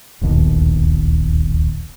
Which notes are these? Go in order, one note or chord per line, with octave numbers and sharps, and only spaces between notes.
D1 A#1 D#2 B2